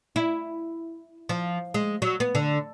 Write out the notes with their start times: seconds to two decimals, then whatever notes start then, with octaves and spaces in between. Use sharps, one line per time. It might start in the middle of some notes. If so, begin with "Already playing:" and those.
0.16 E4
1.29 F3
1.74 G#3
2.02 F#3
2.20 B3
2.35 D3